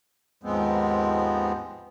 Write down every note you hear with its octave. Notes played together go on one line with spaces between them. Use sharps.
D#2 G#2 F3 G#3 B3 C4